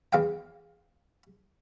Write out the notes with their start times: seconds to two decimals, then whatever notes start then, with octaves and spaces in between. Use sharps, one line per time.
0.13 E2 F5 G5